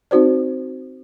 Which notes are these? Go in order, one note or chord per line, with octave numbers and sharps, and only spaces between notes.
C4 D#4 F#4 C5 D5